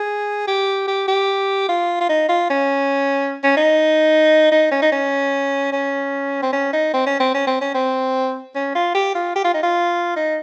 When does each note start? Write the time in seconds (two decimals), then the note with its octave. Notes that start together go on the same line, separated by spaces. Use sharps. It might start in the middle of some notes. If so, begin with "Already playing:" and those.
Already playing: G#4
0.48 G4
0.87 G4
1.08 G4
1.69 F4
2.01 F4
2.09 D#4
2.29 F4
2.50 C#4
3.43 C#4
3.57 D#4
4.51 D#4
4.71 C#4
4.82 D#4
4.92 C#4
5.72 C#4
6.43 C4
6.53 C#4
6.73 D#4
6.94 C4
7.07 C#4
7.20 C4
7.34 C#4
7.47 C4
7.61 C#4
7.75 C4
8.55 C#4
8.75 F4
8.94 G4
9.15 F4
9.36 G4
9.44 F4
9.54 D#4
9.63 F4
10.16 D#4